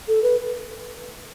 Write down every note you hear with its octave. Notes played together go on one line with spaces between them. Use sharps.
A4
B4